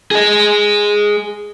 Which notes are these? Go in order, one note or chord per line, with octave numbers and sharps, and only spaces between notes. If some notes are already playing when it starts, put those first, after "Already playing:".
G#4 D#5